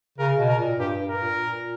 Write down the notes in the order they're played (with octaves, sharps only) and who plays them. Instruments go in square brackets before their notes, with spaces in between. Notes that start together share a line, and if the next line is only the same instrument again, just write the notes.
[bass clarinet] C#3 [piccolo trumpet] A#4
[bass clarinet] B2
[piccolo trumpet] A#4
[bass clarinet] A#2
[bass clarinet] G2 [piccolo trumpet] G4
[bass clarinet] G2
[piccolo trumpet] A#4
[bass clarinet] A#2
A#2